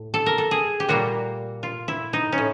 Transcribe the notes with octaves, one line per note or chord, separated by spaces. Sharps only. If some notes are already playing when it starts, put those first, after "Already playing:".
Already playing: A2
A4
A#4
A4
G#4
G4
A#2 G3 A#3 F#4
F4
E4
D#4
C#4
A2